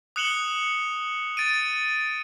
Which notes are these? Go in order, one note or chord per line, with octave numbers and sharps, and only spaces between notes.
D#6 F#6 C#7 E7 F#7 G7
A6 D7 D#7